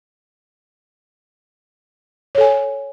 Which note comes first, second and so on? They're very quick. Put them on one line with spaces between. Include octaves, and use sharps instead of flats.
C#5 A4 G#5